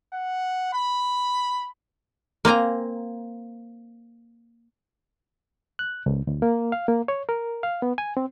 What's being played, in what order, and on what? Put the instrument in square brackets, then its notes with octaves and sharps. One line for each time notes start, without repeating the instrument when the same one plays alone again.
[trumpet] F#5
B5
[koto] A#3 C4 G#5 A#5
[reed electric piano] F#6
C#2
D2
A#3
F5
A#3
C#5
A#4
F5
B3
G#5
C4